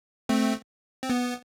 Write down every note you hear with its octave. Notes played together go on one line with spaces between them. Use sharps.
A3 C4
C4
B3